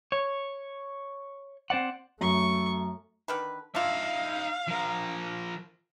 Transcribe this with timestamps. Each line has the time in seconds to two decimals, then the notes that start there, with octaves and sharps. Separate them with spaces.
0.12 C#5
1.70 C4 C5 D5 F#5
2.21 F#2 A3 C#6
3.28 D3 D#3 B4
3.75 D4 D#4 F4 E5 F5
4.68 F3 A#4